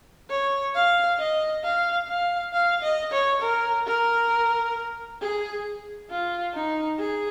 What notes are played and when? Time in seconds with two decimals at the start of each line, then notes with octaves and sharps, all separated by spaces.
0.30 C#5
0.75 F5
1.19 D#5
1.64 F5
2.08 F5
2.53 F5
2.82 D#5
3.12 C#5
3.42 A#4
3.86 A#4
5.21 G#4
6.10 F4
6.54 D#4
6.99 G#4